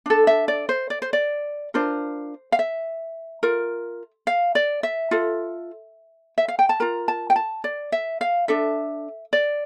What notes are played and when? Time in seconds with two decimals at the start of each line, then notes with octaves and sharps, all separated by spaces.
0.06 D4 A4
0.27 E5
0.48 D5
0.69 C5
0.90 D5
1.02 C5
1.13 D5
1.74 D4 F4 A#4 C5
2.52 F5
2.59 E5
3.43 F4 A#4
4.27 F5
4.55 D5
4.83 E5
5.11 F4 A4
6.38 E5
6.48 F5
6.59 G5
6.69 A5
6.80 F4 A#4 A#5
7.08 A5
7.30 G5
7.36 A5
7.64 D5
7.92 E5
8.21 F5
8.48 D4 A4 E5
9.33 D5